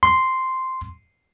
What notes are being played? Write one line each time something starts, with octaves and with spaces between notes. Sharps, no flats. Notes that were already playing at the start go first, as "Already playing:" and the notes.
C6